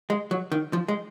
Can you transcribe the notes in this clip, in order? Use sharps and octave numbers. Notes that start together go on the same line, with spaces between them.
G#3
F#3
D#3
F3
G#3